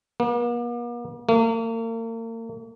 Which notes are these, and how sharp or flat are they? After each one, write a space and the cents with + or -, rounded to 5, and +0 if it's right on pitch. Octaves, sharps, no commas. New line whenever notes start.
A#3 +45
A#3 -40